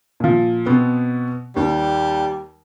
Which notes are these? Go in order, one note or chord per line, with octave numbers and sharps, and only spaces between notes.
A#2 F3
B2 B3 C4
D#2 G3